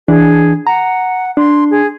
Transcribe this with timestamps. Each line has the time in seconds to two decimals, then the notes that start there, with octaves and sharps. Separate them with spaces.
0.08 E3 D4 G#4
0.67 F#5 A#5
1.37 D4 C6
1.71 G#4